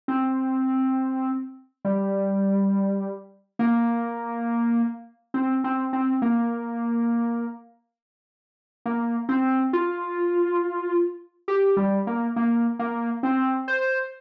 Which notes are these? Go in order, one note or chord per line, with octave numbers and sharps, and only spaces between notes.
C4
G3
A#3
C4
C4
C4
A#3
A#3
C4
F4
G4
G3
A#3
A#3
A#3
C4
C5